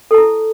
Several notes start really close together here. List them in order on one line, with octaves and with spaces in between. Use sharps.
A4 A5 E4